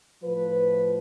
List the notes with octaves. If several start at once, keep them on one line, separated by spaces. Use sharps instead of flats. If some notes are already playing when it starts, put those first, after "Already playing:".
A2 F3 B4